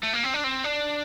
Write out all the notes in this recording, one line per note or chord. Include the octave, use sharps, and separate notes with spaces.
A3
A#3
C4
D4
C4
D4